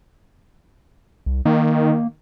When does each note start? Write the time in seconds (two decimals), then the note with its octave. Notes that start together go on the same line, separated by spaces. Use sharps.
1.26 C2
1.45 D#3 A#3